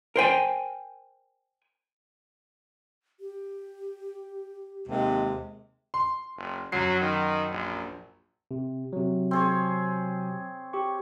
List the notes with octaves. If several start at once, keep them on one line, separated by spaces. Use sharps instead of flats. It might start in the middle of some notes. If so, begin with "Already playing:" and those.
A#4 C5 G5 G#5
G4
D#2 C3 G#3
C6
F#1
F#2 F#3 C7
D#3
A#1
C3
C3 F#3
C4 G#4 C#5
G4 C#6